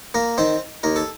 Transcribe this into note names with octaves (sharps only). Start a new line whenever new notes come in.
A#3 A#4
D#3 C4 C5
D#2 A#4
A4